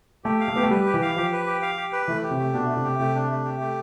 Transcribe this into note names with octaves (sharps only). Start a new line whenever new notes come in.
A3 G4
F5
A3
B3 G4
A3
G3 B4
G4
E3
F5
F3 G4
B4
G4
F5
G4
B4
E3 A3
G4
C3
A3
B2 D4
A3
C3
G4
C3 A3
D4
A3
G4
A3